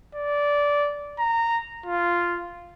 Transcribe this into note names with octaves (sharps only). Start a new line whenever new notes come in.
D5
A#5
F4